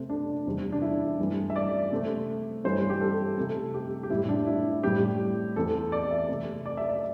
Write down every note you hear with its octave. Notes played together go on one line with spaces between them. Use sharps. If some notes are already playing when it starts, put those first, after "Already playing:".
Already playing: C3 A3 C4
D4
E2 C3 G3 C4
D4
E4
G2 E3 A3 C4
E5
D5
C3 A3 C4
G2 E3 G3 C4 C5
G4
A4
C3 A3 C4 A4
G4
G4
A2 G3 C4 E4
D4
E4
A2 G3 C4 G4
E2 E3 C4 A4
D5
E5
C3 A3 C4
D5
E5
D5